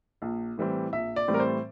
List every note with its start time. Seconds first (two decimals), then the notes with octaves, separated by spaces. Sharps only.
0.22 A#1
0.58 A2 E3 G3 C4
0.93 A#1 E5
1.16 D5
1.28 A2 E3 G3 C4
1.34 A#4
1.40 C5